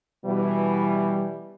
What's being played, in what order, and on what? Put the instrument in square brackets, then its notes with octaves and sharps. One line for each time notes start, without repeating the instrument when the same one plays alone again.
[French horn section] B2 E3 [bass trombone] G3